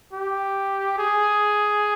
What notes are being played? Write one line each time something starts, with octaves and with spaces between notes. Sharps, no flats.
G4
G#4